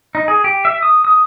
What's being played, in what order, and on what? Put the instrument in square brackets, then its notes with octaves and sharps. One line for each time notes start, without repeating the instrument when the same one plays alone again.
[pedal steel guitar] D#4
G#4
G4
E5
D#6
D#6